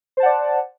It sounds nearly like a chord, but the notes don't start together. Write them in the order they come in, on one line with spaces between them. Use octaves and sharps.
C5 A5 F#5 D5